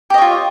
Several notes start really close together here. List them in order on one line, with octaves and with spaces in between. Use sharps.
G4 D#5 C#5 F4